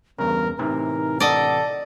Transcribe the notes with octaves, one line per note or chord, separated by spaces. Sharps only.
E2 G2 C#3 B3 A#4
A2 C3 E3 D#4 A#4
A4 D5 D#5 F#5